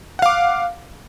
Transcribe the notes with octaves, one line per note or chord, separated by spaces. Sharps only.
F5 F#5 D6